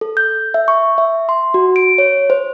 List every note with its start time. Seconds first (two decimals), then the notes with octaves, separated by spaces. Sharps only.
0.01 A4
0.17 G6
0.54 E5
0.68 C#6
0.98 E5
1.29 C6
1.54 F#4
1.76 D7
1.98 C#5
2.30 C5